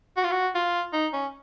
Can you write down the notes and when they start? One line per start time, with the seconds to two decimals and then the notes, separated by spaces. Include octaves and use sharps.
0.16 F#4
0.24 F4
0.31 F#4
0.55 F4
0.93 D#4
1.13 C#4